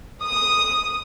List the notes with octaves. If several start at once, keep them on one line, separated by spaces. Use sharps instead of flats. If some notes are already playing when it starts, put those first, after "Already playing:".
D#6